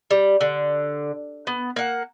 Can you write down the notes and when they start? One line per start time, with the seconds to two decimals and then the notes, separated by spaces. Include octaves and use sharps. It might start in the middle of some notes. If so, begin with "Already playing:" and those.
0.11 G3
0.41 D3
1.47 B3
1.76 A#3 F#5